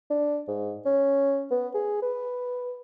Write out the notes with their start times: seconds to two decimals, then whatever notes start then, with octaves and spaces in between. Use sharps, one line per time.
0.10 D4
0.48 G#2
0.86 C#4
1.51 B3
1.74 G#4
2.02 B4